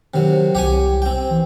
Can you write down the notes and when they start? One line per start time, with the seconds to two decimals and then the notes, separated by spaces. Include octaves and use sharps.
0.14 C3 D#3 F#3
0.55 C2 G4 C#5 G#5
1.02 C4 G5
1.30 E3